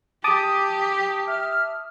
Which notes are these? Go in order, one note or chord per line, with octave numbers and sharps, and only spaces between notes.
G4 A5 D6 D#6
E5 F6